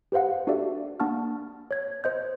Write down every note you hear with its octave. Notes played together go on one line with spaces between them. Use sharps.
G4 B4 C5 F5 F#5
D4 F#4 G4 A4 D5 E5
A#3 D4 F#5 A5 C#6 F6
C#5 G#6
C5 D#5 G6